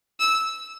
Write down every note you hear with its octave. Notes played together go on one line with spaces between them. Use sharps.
E6